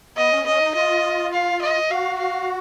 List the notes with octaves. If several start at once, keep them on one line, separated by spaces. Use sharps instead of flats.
B3 D#5
C#4
B3
C#4 D#5
D#4
F4 D#5
F5
D#5
F#4 F5
F5